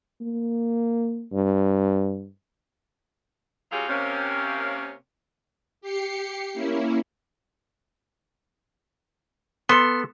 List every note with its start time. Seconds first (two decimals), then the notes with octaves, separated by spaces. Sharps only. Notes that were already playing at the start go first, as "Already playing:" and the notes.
0.21 A#3
1.32 G2
3.72 F#3 G#3 C#4 F4 G4 G#4
3.89 C3 A#3 C#4
5.81 G4 C7 C#7
6.54 A#3 C#4 E4
9.69 B3 A4 C6